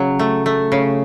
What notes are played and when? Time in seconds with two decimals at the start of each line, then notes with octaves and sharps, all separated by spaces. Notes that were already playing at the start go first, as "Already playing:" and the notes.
Already playing: C#3 F#3
0.19 A3
0.46 A3
0.72 C#3